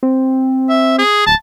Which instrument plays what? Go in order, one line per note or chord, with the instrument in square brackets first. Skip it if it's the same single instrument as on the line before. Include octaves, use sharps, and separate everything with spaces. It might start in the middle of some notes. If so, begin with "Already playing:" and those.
[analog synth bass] C4
[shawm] E5
G#4
[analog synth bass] D1 [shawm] A5